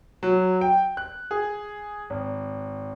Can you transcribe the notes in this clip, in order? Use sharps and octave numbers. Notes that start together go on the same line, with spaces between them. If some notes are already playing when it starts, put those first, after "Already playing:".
F#3
G5
F#6
G#4
G#1